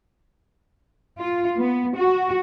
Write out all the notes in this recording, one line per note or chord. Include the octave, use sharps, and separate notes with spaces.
F4
B3
F#4